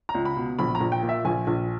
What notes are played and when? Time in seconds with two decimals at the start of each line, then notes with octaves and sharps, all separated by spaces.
0.09 A#5
0.15 C#2
0.25 B5
0.37 B2
0.59 A#1 B5
0.75 A#5
0.81 A#1
0.92 G5
1.03 A#2
1.09 E5
1.25 A#1 G#5
1.47 A#1